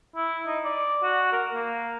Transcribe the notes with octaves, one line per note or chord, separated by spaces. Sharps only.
E4
D#4
D5
F#4
A#4
A#3